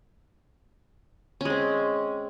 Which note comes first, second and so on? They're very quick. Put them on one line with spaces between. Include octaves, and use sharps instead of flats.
C#4 G#3 C4